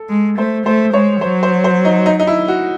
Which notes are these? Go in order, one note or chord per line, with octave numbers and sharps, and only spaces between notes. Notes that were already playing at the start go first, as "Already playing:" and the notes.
Already playing: A4
G#3
A3 C5
A3 C5
G#3 C#5
F#3 C5
C5
C5
D#4
D#4
D#4
E4
F#4